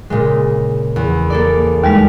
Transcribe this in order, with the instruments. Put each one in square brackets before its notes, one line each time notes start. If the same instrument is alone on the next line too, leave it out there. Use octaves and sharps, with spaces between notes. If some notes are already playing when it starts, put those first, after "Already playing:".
[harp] A#2 C#3 G#3
E2
A#3 A4 D5
[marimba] D#2 G3 G#3 [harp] F6